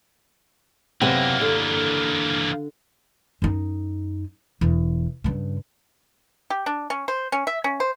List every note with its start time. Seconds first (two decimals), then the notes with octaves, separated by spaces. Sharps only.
1.01 F#2 C3 E3 A#3 B3
1.41 D3
3.42 F#2 D#4
4.61 E1 E2
5.24 G2 C#3
6.50 G4
6.66 D4
6.90 C#4
7.08 C5
7.32 C#4
7.47 E5
7.64 C#4
7.80 C5